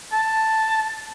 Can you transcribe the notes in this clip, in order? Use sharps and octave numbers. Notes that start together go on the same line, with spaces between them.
A5